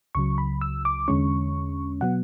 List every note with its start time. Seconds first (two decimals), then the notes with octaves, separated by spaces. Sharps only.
0.15 C#2 C#3 F#3 C#6
0.38 B5
0.61 E6
0.85 D6
1.08 E2 D3 G#3 C#4 C#6
2.01 B2 F#3 B3 F#5